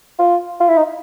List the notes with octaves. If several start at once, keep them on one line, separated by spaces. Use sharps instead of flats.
F4
F4
E4
D#4